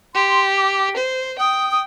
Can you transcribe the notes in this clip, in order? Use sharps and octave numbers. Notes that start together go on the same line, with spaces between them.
G4 C6
D6
C5
G5 D#6
D#6